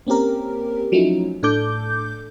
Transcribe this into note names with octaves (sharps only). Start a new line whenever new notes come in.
A#3 C4 C#4 G4 A#4
F3 F#3 A3 C#4 D#4 E4
A2 D4 A4 D6 G6